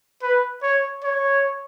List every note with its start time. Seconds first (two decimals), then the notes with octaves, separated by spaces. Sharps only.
0.22 B4
0.63 C#5
1.04 C#5